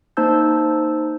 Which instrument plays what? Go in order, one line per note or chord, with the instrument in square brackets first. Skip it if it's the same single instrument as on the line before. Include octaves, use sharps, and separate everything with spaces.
[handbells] A#3 D#4 C5 A5 E6 G6